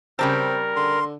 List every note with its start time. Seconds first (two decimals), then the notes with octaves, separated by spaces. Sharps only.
0.19 C#3 G3 C4 A#4 A5
0.76 D3 C6